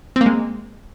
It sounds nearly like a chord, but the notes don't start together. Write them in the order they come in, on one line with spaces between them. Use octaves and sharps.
C4 A#3 G#3